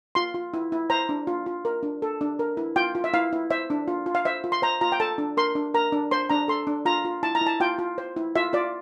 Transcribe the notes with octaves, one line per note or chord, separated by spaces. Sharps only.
F4 C6
F4
E4
E4
C5 A#5
D4
F4
F4
A#4
D4
A4
D4
A#4
E4
F4 G5
F4
E5
E4 F5
E4
C5 E5
D4
F4
F4
F5
C5 E5
F4
C6
C5 A#5
F4 A#5
G5
A4 A5
D4
A#4 C6
D4
A#4 A#5
D4
C5 C6
D4 A#5
A4 C6
D4
F4 A#5
F4
E4 A5
A#5
E4
A5
F4 G5
F4
C5
E4
F4 E5
F4 D5